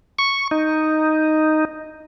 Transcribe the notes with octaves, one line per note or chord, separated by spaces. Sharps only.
C#6
D#4